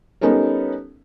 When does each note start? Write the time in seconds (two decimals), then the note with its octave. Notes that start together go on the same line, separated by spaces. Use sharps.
0.21 G3 B3 C#4 D#4 A4 A#4